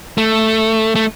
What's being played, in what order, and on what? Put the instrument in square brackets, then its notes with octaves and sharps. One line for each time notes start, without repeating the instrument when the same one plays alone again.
[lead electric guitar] A3
A3